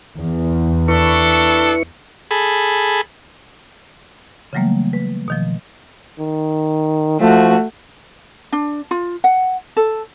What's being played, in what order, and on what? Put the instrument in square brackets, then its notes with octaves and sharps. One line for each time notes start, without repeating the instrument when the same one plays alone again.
[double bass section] E2
[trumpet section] D4 A4 [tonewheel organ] E4 B4 C#6
[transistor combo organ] G#4 A4 B5
[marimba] C#3 E3 F#3 G3 A3 A#3
B4
B2 D#3 F3
[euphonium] D#3
[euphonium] F3 [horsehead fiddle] A3 F#4
[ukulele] D4
F4
F#5
A4